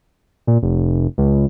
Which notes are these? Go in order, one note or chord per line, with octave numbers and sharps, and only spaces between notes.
A#2
F1
C#2